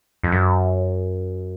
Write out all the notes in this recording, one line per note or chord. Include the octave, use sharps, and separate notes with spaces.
F2
F#2